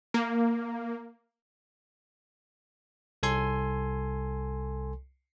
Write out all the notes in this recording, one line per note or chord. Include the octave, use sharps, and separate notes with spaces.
A#3
C2 A4 G#5 C6